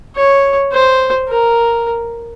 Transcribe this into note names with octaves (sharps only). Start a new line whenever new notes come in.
C#5
C5
A#4